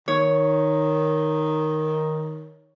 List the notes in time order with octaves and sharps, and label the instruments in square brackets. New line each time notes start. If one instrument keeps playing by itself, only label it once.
[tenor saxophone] D#3 [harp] C#5